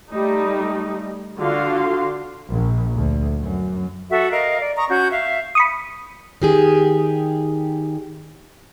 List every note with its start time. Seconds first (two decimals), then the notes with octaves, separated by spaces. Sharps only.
0.12 G3 A3 D#4
1.39 D3 F4 F#4 F5 C6
2.51 A#1
2.96 D2
3.41 F#2
4.10 F#4 A4 E5
4.32 A#4 D#5 F5
4.61 D5
4.77 A#5 C#6 D#6
4.89 C#4 F#4 G6
5.11 E5 F5
5.55 B5 C#6 D#6
6.42 D#3 G4 G#4